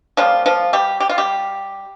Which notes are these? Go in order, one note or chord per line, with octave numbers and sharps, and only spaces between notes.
C#3 F3 G3 A#3 F4
F3 F4
G3 G4
G4
F4
G3 G4